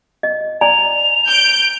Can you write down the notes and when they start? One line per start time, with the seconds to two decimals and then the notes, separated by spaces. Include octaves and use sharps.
0.23 D#5
0.61 D5 G#5 A#5 F7
1.28 G6 D7